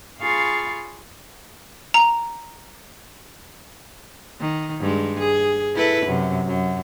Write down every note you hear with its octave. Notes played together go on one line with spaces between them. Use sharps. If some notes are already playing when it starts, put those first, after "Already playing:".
F4 G#4 F5 B5 C#6 A6
A#5
D#3
G2 G#3
G#4
E4 A4 B4
F#2 C3
F#2